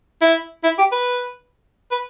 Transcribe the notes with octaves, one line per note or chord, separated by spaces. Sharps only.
E4
E4
G4
B4
B4